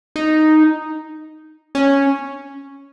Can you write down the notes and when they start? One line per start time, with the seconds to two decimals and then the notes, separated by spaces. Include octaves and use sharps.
0.16 D#4
1.75 C#4